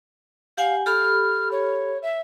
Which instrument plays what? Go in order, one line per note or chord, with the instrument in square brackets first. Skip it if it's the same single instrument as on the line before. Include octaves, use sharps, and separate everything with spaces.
[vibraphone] G4 F#5 G#5 [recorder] F5
[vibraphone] G4 A4 B5 [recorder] F6
[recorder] C#5
E5